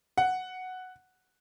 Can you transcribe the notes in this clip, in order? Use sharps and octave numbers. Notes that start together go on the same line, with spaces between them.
F#5